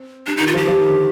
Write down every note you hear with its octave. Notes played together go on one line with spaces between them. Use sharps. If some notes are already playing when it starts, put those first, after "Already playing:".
Already playing: C4
G3 D4
D#3 D#4
F4
F3 G4
F3
D#3
D3